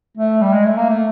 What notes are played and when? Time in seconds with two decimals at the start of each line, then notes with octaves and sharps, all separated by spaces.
0.17 A3
0.41 G3
0.53 G#3
0.65 A3
0.77 A#3
0.89 A3